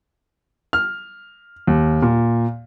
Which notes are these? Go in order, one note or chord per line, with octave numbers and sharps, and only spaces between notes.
F6
D#2
A#2